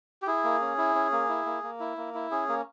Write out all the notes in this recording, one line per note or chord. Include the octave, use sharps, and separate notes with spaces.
G4
E4 G#4
A#3
C#4
E4
C#4
A#3
E4
A#3
A#3
E4
A#3
E4
C#4 G#4
A#3